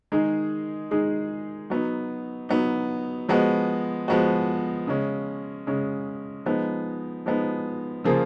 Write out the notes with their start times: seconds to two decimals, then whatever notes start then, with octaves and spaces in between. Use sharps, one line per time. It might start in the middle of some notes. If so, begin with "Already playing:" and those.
0.12 D#3 G#3 D#4 G#4
0.91 D#3 G#3 D#4 G#4
1.70 F#3 B3 D#4
2.49 F#3 B3 D#4
3.29 F3 G#3 B3 F#4
4.08 F3 G#3 B3 F#4
4.87 C#3 G#3 C#4
5.67 C#3 G#3 C#4
6.46 F3 G#3 B3 D#4
7.26 F3 G#3 B3 D#4
8.04 C#3 F3 A#3 F4 G#4